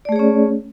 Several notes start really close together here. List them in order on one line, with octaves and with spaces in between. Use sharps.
D5 A3 G#4 C#5 C#4